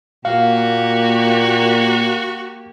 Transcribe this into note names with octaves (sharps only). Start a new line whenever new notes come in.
A#2 A#3 F#4 G4 F5